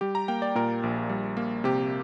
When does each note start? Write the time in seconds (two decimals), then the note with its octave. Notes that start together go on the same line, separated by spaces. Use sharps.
0.01 G3 G4
0.15 A#5
0.28 A#3 G5
0.42 D5
0.55 A#2 A#4
0.83 A#1
1.09 G3
1.37 A#3
1.64 C3 G4